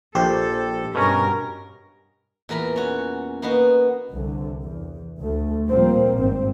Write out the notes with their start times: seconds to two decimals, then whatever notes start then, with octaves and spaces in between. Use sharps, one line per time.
0.15 A#1 G4 A4 C5
0.95 G2 B2 C#4 A#4
2.49 E2 A#2 A#4 A#5 B5
2.76 C#4 F#4
3.42 A#3 B3 D#4 F#4
4.10 C2 D3
4.63 E2
5.20 D2 A3
5.69 A#2 F3 G3 A#3 C4
6.16 G#1 G2 C4